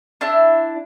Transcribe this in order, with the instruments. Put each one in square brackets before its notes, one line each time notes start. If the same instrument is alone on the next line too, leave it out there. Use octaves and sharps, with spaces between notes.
[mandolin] D4 E4